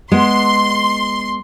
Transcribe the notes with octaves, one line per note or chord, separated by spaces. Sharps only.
G#3 B3 C6